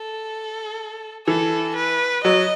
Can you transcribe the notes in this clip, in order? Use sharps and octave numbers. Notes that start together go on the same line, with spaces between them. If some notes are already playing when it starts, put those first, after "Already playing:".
Already playing: A4
E3 A4
B4
F#3 D#5